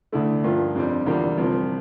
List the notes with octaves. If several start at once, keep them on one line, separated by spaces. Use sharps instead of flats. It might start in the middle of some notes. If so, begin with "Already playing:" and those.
D2 D3 A3 E4
G2 F3 A#3 F4
F2 C3 G3 D4
E2 D3 G3 A#3 F4
C2 C3 F3